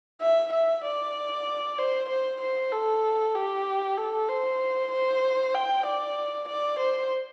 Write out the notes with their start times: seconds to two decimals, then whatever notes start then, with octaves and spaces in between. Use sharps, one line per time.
0.21 E5
0.53 E5
0.84 D5
1.78 C5
2.09 C5
2.42 C5
2.72 A4
3.35 G4
3.98 A4
4.29 C5
4.92 C5
5.54 G5
5.86 D5
6.49 D5
6.79 C5